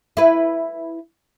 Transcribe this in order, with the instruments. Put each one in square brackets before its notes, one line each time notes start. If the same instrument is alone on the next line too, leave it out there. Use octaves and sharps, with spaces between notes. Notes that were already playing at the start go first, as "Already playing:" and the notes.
[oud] E4 B4